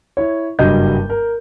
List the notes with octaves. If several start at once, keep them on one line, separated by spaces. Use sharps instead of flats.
E4 C#5
F#1 G2 F#3 G3 D#5 G6
A#4